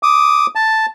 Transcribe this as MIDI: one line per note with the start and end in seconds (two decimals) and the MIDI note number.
0.03 0.46 86
0.03 0.46 87
0.55 0.86 81